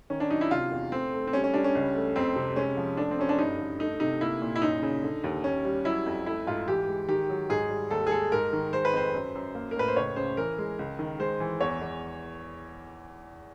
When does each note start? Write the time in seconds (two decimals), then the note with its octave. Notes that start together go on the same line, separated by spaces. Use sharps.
0.10 D#3 C#4
0.20 D4
0.31 F#3 D#4
0.41 E4
0.51 C3 F4
0.71 E2
0.92 A3 C4
1.13 A3
1.27 C4
1.33 G3 C#4
1.44 C#4
1.54 G3 D4
1.64 C#4
1.75 C#2
1.95 A3
2.16 F2 C4
2.36 C3
2.56 G#3 C#4
2.77 F3
2.97 A3 D4
3.11 C4
3.18 F#2 C#4
3.29 D4
3.38 G2 D#4
3.59 D3
3.79 A3 D#4
4.00 C3 D#4
4.21 A#3 E4
4.42 A#2
4.56 E4
4.62 F#2 D#4
4.83 C#3
5.03 D3
5.24 D#2
5.44 D#2 C#4
5.65 G3
5.85 F#3 E4
6.06 F2
6.26 A3 E4
6.47 G#2 F4
6.68 E3 G4
6.89 G#3
7.08 D#3 G4
7.29 F#3
7.50 G#2 G#4
7.70 G3
7.91 D#2 A4
8.07 G#4
8.11 G#3 A4
8.32 G#2 A#4
8.53 D#3
8.73 G#3 C5
8.85 B4
8.93 F2 C5
9.14 F#2
9.35 F#2
9.55 A#3
9.71 A#4
9.76 A2 B4
9.88 C5
9.96 C#2 C#5
10.16 C#3 C5
10.37 E3 A#4
10.58 G#3
10.79 C#2
10.99 D#3
11.20 G#3 C5
11.40 E3
11.60 E2 C#5
11.81 E2